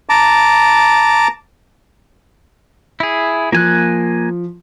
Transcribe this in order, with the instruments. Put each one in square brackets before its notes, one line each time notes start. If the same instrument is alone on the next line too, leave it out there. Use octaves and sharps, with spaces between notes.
[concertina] A5 A#5 D6
[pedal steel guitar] E4 G#4
[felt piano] F3 [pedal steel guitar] A#3 G#5 F#6